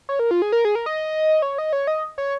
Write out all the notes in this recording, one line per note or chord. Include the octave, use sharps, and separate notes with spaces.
C#5
A#4
F4
G#4
A#4
G#4
A#4
D#5
C#5
D#5
C#5
D#5
C#5